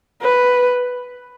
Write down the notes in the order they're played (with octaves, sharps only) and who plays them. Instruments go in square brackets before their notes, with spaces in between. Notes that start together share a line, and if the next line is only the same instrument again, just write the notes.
[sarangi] B4